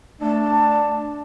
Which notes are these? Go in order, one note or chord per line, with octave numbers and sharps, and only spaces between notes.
A3 D4 A5